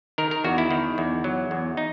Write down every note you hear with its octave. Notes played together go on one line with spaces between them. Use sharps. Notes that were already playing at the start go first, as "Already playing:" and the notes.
D#3 A#4
A#4
E2 F#4
E4
D#3
E2
F#3
E2
D#4